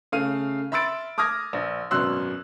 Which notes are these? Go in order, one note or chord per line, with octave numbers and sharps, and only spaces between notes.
C#3 A3 F5 F6 D#7
E5 B5 C6 E6 A6 D7
D6 D#6 F6 G#6 A#6
A#1
G#1 F#2 B2 C6 E6 F#6